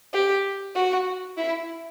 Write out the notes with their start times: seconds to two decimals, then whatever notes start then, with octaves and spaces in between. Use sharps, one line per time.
0.13 G4
0.75 F#4
1.37 E4